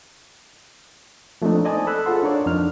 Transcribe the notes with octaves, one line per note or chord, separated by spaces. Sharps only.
F3 A3 A#3 C4 D4 D#4
C5 D5 D#5 G#5 A5
A4 B5 E6 F#6
F4 G#4 A4 C5 F#5 C6
D4 D#4 A#4 C#5 D5
F2 D4 D#4 F6